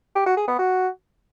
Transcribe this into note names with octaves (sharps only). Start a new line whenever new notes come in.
G4
F#4
G#4
B3
F#4